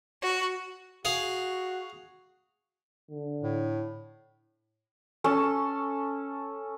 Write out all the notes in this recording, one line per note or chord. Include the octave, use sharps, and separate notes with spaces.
F#4
F#4 G#4 F5
D3
A2
C#4 A4